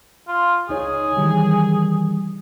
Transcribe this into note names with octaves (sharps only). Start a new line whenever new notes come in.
F4
C#2 D#4 G#4 C#5
D#3 E3 G3